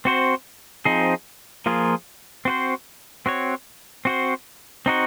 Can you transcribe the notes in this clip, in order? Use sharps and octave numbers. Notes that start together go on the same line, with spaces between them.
C4 F#4 C5
F3 C4 D#4 G#4
F3 A#3 F4 G#4
C4 F#4 C5
C4 F#4 C#5
C4 F#4 C5
C4 D#4 F#4 C5